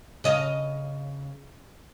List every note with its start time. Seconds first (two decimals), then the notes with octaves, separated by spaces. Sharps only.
0.24 C#3 D#5 F5